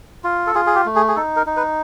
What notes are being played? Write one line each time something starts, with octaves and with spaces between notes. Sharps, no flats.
F4
A4
F4 G#4
G#4
G4
A3
G#4
G#4
D#4 A4
A#4
D#4
B4